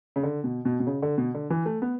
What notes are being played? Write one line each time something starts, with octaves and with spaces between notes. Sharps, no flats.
C#3
D3
B2
B2
B2
C#3
D3
B2
D3
E3
A3
B3